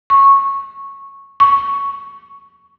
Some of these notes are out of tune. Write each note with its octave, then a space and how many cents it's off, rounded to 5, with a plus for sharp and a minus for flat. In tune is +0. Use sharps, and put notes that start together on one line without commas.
C#6 -10
C#6 +10